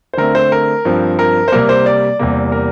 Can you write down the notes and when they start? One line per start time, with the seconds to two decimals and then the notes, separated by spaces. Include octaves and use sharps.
0.14 C5
0.17 D3 A3 C4 A#4
0.35 C5
0.52 A#4
0.85 G2 F3 C4
1.19 A#4
1.48 C5
1.52 C3 G3 A#3 A#4
1.69 C5
1.86 D5
2.19 E2 C3 G3 A#3
2.52 A#4